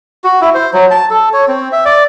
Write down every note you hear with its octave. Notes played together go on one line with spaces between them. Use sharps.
F#4
E4
C5
F#3
A5
A4
C#5
C4
E5
D5